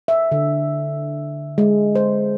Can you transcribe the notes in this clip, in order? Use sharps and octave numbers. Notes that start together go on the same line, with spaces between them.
E5
D3
G#3
C5